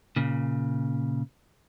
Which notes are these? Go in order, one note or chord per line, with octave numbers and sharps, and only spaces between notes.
A#2 C#3